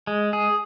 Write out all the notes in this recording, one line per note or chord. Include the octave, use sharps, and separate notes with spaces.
G#3
G#4